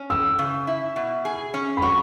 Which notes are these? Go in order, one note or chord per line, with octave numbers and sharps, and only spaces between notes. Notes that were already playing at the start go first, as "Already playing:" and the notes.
Already playing: C#4
E3 E6
C#3
E4
B2
G#4
C#4
B5
F#3 C#6